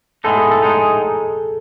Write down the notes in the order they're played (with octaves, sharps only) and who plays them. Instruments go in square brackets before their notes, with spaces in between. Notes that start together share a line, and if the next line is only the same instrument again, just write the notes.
[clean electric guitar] A2 G#3 B3 D#4 [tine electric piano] A4
[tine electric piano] G#4
A4
[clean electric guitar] A2 G#3 D#4